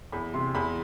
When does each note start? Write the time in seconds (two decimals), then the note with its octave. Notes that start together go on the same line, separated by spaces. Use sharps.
0.12 E2 B5
0.34 C3 C6
0.55 E2 B5